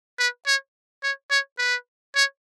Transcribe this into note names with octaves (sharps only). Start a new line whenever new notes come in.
B4
C#5
C#5
C#5
B4
C#5